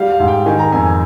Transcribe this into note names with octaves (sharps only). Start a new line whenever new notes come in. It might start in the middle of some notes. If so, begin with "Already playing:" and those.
Already playing: G3 F5
F5
G#2
G5
D#3 G#5
A#5
F2 G#5
G#5